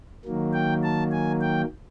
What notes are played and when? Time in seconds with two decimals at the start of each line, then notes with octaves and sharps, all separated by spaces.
0.25 D#3 F#3 A#3
0.53 G5
0.83 A5
1.12 G#5
1.41 G5